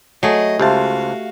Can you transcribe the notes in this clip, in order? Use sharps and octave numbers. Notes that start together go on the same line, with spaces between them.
F#3 A3 G#4 D#5
C#2 F#4 G4 C5 E5 F5 A5